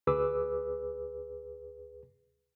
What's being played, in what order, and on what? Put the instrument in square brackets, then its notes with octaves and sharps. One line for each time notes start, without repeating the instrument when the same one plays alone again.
[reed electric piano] D2 G#4 B4 D6 E6